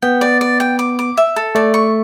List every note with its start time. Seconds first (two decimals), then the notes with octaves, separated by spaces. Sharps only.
0.02 B3 G5
0.21 D5
0.41 D5
0.60 G5
0.79 D6
0.99 D6
1.17 E5
1.36 A4
1.55 A3 D5
1.74 C#6